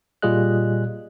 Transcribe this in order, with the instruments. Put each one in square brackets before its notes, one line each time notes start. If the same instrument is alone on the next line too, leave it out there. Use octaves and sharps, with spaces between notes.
[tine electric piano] A#2 G3 F4 G#4 D#5 F#6